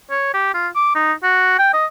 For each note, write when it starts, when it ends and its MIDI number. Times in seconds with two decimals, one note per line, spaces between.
0.11 0.30 73
0.34 0.53 67
0.54 0.68 65
0.75 0.93 86
0.95 1.13 63
1.23 1.54 66
1.59 1.73 79
1.73 1.85 75